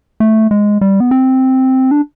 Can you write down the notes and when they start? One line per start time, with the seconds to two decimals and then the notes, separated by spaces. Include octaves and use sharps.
0.20 A3
0.51 G#3
0.81 G3
1.00 B3
1.11 C4
1.91 D4